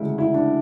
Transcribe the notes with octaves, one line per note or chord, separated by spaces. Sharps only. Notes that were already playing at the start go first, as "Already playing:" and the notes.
Already playing: D2 C#3 E3 G#3 E4
E4
D4